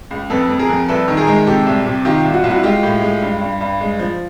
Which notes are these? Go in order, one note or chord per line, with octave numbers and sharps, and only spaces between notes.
C#2
F2 A4 B4
F2
G#4 A#4
F2
C2 A4 B4
D#3
G#4 A#4
G#3
C3 G4 A4
C2
C3
D#3 F4 G4
C2
F#4
C2 F4
E4 F#4
G#3 F4 G4
A2
G#3
G2
G2
G2
G#3
F3